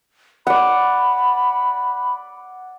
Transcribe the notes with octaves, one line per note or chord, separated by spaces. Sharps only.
D5 F#5 B5